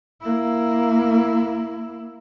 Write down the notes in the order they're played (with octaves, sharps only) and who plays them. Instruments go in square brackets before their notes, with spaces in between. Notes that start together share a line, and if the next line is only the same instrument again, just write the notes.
[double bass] A#3 E4